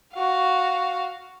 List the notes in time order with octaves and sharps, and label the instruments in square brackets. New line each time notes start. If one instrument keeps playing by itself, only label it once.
[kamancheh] F#4 F5